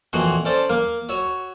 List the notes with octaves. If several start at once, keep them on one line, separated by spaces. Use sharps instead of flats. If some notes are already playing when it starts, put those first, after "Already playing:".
F2 A#2 E3 F#4 F#5 C6
C#4 A4 C5 D5
A#3 A#4 F5
F#4 C#5 E5